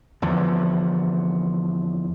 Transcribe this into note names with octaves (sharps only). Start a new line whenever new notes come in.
E2 D3 F3